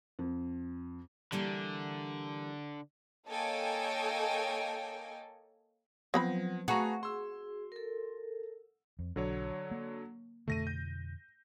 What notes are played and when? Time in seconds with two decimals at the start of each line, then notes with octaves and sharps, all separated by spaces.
0.19 F2
1.32 D3 E3 G3 A#3
3.28 A#3 A4 C#5 D#5 G5 G#5
6.14 F3 F#3 B3 C4 B5
6.68 A3 F#4 G#4 B4 A#5
7.03 G#4 C6 E6
7.72 A4 A#4
8.99 F2
9.16 B1 D3 F#3 C#5
9.71 A#3
10.48 F2 B2 D3 A3 A#6 D#7
10.67 G6